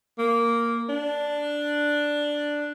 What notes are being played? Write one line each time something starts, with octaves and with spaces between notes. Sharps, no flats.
A#3
D4